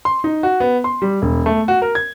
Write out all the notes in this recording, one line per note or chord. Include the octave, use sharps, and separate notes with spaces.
C6
D#4
F#4
B3
C6
G3
E1
A3
F#4
A#4
G#6